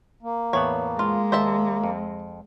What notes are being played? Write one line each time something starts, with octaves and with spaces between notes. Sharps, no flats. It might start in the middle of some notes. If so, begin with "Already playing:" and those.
A#3
E2 A2 B3 C#5
G#3 F4
D#2 C5 E5 A5
F2